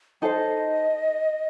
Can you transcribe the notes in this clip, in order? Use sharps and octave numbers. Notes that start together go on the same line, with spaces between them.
D#4 A4 C5 D#5 G5